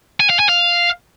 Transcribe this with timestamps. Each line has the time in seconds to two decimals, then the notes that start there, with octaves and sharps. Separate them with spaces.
0.20 G#5
0.30 F5
0.39 G#5
0.49 F5